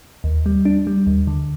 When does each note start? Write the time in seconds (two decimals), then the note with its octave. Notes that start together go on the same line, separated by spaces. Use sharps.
0.24 D#2
0.46 G3
0.65 D4
0.87 G3
1.07 D#2
1.27 D3